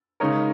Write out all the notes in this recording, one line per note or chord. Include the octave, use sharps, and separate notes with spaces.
C#3 G#3 D#4 A#4 C#5